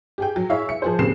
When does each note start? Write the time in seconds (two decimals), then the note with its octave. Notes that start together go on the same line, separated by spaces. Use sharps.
0.18 G4 G#4 G5
0.36 F#3
0.50 E4 G#4 C#5 E5 F5
0.69 E5 C#7
0.82 F3 G#4 C5
0.99 D#2 C#3 C4 C7 E7